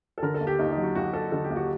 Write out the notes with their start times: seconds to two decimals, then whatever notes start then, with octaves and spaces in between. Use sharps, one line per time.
0.18 A4
0.22 D3 A#4
0.34 A4
0.41 D#2
0.47 G4
0.59 D#2 D#4
0.71 D#4
0.77 F#3
0.83 F#4
0.95 D#2 F#4
1.13 D#2 A4
1.32 D3 A4
1.44 G4
1.50 D#2
1.56 F#4